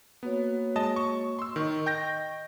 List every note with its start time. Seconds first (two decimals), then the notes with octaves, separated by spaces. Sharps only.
0.23 A#3 B3 F#4 C#5
0.76 G#3 D#5 A5
0.96 C#6
1.39 C6 E6
1.56 D#3 D#5 C#6
1.86 G5 G6 A#6